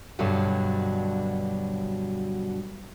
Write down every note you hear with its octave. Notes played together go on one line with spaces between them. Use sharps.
G2 B2 D3 F#3 G3